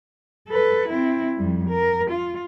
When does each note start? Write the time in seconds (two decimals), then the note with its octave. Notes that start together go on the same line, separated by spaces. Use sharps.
0.49 A4 B4
0.89 C4 E4
1.37 F2 G3
1.69 A#4
2.10 F4